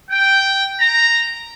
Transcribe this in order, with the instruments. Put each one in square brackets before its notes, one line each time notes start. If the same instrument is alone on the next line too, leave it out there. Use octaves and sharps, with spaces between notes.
[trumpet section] G5
A#5